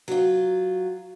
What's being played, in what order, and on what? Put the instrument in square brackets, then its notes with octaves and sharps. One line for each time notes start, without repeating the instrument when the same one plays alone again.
[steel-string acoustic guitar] F#3 F4